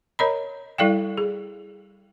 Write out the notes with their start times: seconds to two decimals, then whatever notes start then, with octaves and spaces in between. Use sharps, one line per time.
0.19 A#4 C#5 D#5 A#5 B5
0.78 G3 E4 A4 D5 F5 G5
1.18 G#4